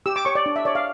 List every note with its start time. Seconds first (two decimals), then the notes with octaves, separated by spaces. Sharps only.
0.06 G4 E6
0.16 D6
0.25 C#5 C#6
0.35 D5
0.46 D4
0.56 E5
0.65 C#5 D5
0.75 F5